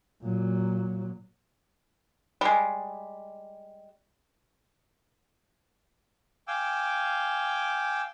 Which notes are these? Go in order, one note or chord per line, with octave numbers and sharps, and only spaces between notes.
A#2 F#3
G3 G#3
F5 G5 G#5 D6 E6